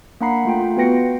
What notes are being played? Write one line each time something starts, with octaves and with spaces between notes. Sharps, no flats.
A#3 D4 F#5 A#5 B5 C7
A3 F4 G5
F4
B3 F#4 B4 G5 A#6 C#7